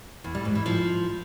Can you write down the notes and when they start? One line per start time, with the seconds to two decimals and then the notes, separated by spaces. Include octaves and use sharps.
0.24 E2
0.35 G3
0.45 G#2
0.55 E3
0.66 F3